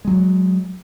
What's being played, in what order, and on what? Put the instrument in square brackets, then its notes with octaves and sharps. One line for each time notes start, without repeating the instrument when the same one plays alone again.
[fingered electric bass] F#3 G#3